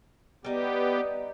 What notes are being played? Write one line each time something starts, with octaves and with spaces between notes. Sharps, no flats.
G3 B3 D#4 G4